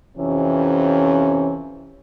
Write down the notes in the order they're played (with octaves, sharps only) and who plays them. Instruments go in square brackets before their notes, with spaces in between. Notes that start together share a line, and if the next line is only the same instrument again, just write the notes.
[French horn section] F2 C3 E3 C#4